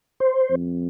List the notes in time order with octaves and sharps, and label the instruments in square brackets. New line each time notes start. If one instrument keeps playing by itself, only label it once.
[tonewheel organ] C5
[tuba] F2